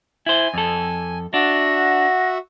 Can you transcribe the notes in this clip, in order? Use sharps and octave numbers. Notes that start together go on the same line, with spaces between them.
E4 C5 G#5
F2 A4
D4 F#4 E5 F#5 A#6